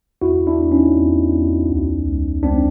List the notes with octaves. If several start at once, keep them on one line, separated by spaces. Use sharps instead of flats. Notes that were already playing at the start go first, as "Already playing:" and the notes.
E2 E4 F#4
D4 E4
E2
C#4 D#4
E2
E2
C#2
C#2
C#2 C4 D4